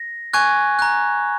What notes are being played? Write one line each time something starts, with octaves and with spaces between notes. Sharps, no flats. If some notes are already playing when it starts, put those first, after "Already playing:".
Already playing: A#6
G#5 C#6 F#6 G#6
A#5 F#6